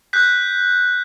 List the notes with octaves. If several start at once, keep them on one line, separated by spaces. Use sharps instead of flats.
F#6 G6 B6